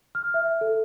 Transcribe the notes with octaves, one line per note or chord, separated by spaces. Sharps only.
F6
E5
A4